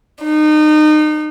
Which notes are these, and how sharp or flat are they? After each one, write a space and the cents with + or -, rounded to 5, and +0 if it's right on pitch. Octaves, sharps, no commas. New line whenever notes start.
D#4 -30